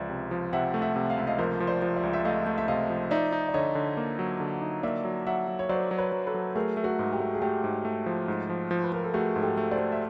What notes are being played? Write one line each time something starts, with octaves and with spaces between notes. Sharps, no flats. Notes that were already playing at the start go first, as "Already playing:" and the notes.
Already playing: C#2 F3 D5 E5
C3
F3
C3 E5 F#5
A3
E5 F#5
C3
F5
C#2 E5
D#5 F5
F3 A#4 C5
F3
C5 D5
F3
D5 E5
C#2
E5
A3 D#5 F5
A3
E5
C3 D#5 F5
F3
D#4 D5 E5
D#4
D5
D3 C#5 D#5
D3
A#3
F#3
D3
D#4
A#3 D5 E5
F#3
F#3 E5 F#5
F#3
C#5
F#3 C5 D5
F#3
B4 C#5
F#3
A4 B4
F#3
A3 G#4 A#4
A3
F#4 G#4
G#2
G4
A3
G#4
A3 G4
G#2
A3
F3
G#2
F3
F3
B4
F3 A#4
A4
A3 F#4 G#4
G#2
G4 A4
A3
C5 D5
A3
E5